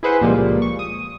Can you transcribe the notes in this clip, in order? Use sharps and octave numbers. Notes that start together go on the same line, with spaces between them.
E4 G#4 B4 C5 F#5
C#2 A#2 F3 G3 G#3 A#3
C#6
D#6